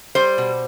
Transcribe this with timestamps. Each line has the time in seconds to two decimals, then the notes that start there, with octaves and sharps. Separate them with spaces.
0.15 G3 C5
0.38 B2